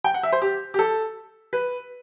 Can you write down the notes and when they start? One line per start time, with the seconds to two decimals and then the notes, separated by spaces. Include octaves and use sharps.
0.04 G5
0.14 F#5
0.23 E5
0.32 C5
0.42 G4
0.74 G4
0.79 A4
1.53 B4